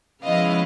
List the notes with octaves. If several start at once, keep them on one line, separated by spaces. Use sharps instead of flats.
C#3 F3 G#3 B3 E4 D#5 F5